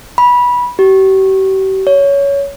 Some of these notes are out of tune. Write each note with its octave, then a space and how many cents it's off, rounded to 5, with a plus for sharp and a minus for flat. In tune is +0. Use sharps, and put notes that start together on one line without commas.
B5 -15
G4 -40
C#5 +15